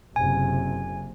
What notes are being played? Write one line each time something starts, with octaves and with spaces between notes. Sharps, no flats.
F#1 C3 G#5